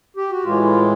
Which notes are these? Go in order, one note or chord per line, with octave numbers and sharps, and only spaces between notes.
G4
F#4
A2 E3 G#3 F4
F4